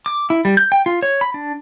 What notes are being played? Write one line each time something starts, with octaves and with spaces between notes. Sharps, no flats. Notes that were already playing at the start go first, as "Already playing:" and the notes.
D6
E4
G3
G6
G5
F4
C#5
B5
D4